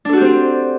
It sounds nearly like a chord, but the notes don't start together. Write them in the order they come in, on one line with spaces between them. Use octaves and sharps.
D4 A4 F#4 G4 C4